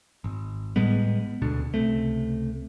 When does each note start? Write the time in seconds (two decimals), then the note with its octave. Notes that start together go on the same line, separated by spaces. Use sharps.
0.24 G#1
0.76 A2 G3 G#3 B3
1.42 D2 B2 D3
1.74 C#2 C3 A3